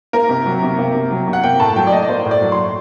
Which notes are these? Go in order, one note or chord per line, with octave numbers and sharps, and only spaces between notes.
A#3 A#4
C3
F#3
C3
A#3
C3
F#3
C3
F#5
A#3 G5
A2 A5
F#3 G5
D5
A2 D#5
D5
A#3 C5
A2
D5
F#3
C6
A2